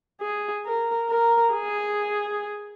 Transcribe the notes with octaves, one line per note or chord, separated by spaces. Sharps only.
G#4
A#4
A#4
G#4